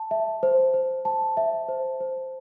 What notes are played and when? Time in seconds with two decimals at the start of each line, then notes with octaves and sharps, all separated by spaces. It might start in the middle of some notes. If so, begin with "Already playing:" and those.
Already playing: A5
0.11 E5
0.43 C5
0.74 C5
1.05 A5
1.37 E5
1.69 C5
2.00 C5